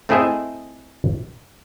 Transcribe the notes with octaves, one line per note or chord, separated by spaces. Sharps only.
A3 C4 E4 G#4 D#5 E5